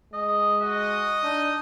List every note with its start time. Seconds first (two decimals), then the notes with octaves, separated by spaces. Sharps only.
0.13 G#3 D#5
0.62 F#4 D#5
1.24 D4 D#4